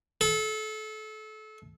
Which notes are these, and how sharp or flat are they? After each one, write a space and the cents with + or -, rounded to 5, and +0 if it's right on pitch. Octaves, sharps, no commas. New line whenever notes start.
A4 -30